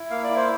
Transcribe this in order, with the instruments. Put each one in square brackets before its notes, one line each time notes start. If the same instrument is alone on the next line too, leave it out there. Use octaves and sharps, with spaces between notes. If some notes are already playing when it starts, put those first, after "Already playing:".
Already playing: [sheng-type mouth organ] E4
A#3 F5
D5
E4
C5